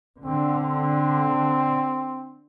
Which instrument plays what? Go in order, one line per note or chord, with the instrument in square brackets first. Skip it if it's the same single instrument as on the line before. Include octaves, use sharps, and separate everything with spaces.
[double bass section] D3 [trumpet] C4
[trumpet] C4